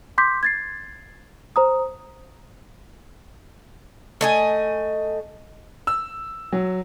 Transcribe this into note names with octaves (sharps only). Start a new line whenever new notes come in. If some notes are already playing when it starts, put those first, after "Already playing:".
C6 D6 G6 B6
G#6 A6 C7
C5 A#5 D#6
A3 D#5 G#5
E6
F#3